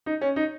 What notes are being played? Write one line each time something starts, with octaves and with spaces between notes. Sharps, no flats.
D#4
C#4
D#4